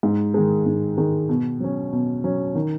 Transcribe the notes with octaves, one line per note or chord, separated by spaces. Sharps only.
G#2
D#3 G#3
G#2
D#3 G#3
B2
F#3 C#4
B2
F#3 C#4
D#3